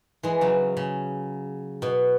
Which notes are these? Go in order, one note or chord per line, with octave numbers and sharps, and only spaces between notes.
E3 G#3
C#3 F#3
C#3
B2